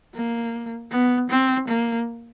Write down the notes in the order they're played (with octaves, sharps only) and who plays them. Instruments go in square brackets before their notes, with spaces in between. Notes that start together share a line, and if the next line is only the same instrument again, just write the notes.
[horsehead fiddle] A#3
B3
C4
A#3